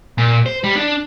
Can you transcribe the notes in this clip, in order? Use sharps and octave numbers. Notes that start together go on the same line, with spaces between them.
A#2
C5
G3
D4